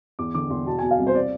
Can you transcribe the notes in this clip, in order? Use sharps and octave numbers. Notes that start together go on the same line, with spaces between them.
E2 D6
D3 D6
E2 C6
B2 A5
G#5
B2
F5
C2
C5
D5